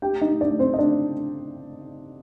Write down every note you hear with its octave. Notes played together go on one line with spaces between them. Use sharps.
G4 G5
D#4 D#5
D4 D5
C4 C5
D#5
D4 D5